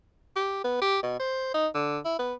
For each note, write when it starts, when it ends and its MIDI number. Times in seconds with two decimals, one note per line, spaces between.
0.36 0.62 67
0.64 0.79 59
0.81 1.00 67
1.03 1.19 47
1.20 1.53 72
1.54 1.68 63
1.75 1.99 50
2.05 2.18 64
2.19 2.34 59